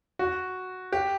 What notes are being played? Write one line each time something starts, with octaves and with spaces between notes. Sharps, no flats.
F#4
G4